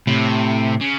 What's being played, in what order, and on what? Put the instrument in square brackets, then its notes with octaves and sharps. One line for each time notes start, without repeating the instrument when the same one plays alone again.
[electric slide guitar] A2 [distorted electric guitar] C3
[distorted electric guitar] C#3